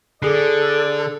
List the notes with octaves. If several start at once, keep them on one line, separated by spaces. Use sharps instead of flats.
D3 G#4 A4 D5 C7